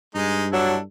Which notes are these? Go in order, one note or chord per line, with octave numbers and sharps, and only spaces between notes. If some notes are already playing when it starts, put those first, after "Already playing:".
G2 G#3 D#4
F#3 D4 E4 A4